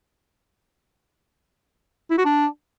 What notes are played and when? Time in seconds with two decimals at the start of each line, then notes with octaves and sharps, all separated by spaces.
2.11 E4
2.18 F#4
2.25 D4